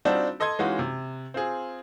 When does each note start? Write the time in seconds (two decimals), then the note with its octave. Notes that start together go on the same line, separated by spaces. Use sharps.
0.05 G3 C4 D4 D#4 F4 F#4
0.40 A4 D#5 C6 D#6 G#6
0.59 E3 G#3 C#4 D#4 F4 F#4
0.79 C3
1.34 C4 F4 G#4